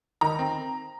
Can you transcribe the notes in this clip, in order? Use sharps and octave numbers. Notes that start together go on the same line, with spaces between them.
D#3 A#5
C4